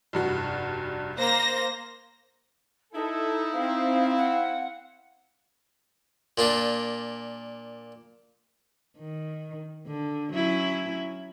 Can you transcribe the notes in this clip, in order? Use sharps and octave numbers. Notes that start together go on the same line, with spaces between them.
F1 G2 F#4
A#3 C5 A#6
D#4 E4 A4
C4 F5
F#5
A#2 A#3 D4
D#3
D3
F#3 C#4 E4